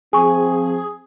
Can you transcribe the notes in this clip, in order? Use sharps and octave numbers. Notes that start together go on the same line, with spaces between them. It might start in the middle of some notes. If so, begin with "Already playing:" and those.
F3 C4 G#4 G#5 C#6